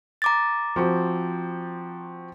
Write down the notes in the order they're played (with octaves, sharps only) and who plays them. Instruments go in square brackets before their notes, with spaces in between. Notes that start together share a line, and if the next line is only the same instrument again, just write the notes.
[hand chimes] A#5 D6 A6
[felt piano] F3 C4 F#4